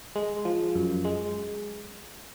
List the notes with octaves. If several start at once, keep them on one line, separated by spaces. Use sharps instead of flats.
G#3
F3
F#2
G#3